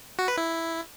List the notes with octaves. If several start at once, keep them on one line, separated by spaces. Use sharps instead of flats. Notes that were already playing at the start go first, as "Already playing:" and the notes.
F#4
B4
E4